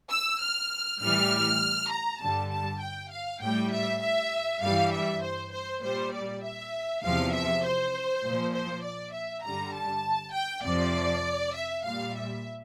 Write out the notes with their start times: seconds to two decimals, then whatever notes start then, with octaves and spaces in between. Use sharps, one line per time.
0.11 E6
0.41 F6
1.01 A2 E3 G3 F6
1.92 A#5
2.22 G2 D3 G3 A5
2.51 A5
2.82 G5
3.12 F5
3.42 A2 G3 G5
3.72 E5
4.02 E5
4.62 G2 E3 G3 F5
4.93 E5
5.23 C5
5.53 C5
5.83 A#2 G3 C5
6.14 D5
6.44 E5
7.03 E2 C3 F3 F5
7.34 E5
7.65 C5
8.24 A#2 F3
8.54 C5
8.84 D5
9.14 E5
9.45 G2 D3 G3 A#5
9.75 A5
10.35 G5
10.65 F2 C3 F3 D5
11.56 E5
11.85 A#2 G3 F5
12.16 E5